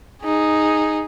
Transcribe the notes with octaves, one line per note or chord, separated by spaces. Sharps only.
D#4 G#4